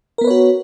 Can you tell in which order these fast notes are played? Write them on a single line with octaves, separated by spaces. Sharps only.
A#4 B3 B4 C#5 F#4